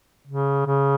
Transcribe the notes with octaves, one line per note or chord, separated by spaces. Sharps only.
C#3
C#3